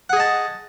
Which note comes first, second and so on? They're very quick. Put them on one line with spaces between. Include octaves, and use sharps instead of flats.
F#5 G#4 D#5 A5